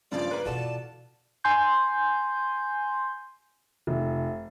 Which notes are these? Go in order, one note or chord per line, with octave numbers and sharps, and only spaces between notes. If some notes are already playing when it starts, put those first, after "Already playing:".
G2 C#3 F3 F4 C5 D5
A#3 G#4 B4
B2 E3 F4 F#4 A4 D5 A5
G#5 C6 G6
F1